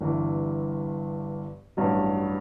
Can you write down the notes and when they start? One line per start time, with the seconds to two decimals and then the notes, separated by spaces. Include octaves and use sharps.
0.01 G1 G2 E3
1.77 A1 G2 F#3